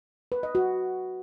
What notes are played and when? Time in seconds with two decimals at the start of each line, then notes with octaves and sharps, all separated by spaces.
0.32 B4
0.43 D#5
0.55 F#4